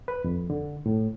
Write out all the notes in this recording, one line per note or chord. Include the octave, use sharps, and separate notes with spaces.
B4
F2
D3
A2